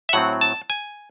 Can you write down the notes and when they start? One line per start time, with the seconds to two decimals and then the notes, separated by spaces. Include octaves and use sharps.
0.09 E5
0.13 A2 F#3 C4 F#5
0.41 A5
0.70 G#5